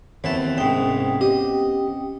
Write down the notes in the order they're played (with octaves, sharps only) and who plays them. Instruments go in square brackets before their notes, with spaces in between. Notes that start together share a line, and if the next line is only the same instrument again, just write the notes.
[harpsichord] D#2 E3 A5 [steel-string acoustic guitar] B3 C4
[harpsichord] C2 G#2 [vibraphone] C#4 G5 D#6
[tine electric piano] G4 [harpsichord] D#5